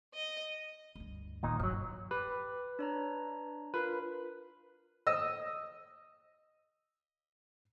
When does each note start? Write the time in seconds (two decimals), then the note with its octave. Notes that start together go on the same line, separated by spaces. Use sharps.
0.14 D#5
0.95 D2 G2
1.43 G1 D#2 A#2 D#4
1.60 G2 F3 F#3
2.11 G4 B4
2.79 D4 C#5 A#5
3.74 F4 A#4 B4
5.07 D#5 E6